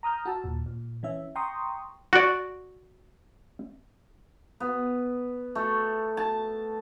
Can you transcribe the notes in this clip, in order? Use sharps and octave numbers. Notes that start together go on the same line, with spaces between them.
A#5 D#6 F6 G6
F#4 A5 E6
D#2 A#2
A#2
E3 C#4 E5
G5 A#5 C6 C#6 D#6
F#4 D5
B3
A3
A5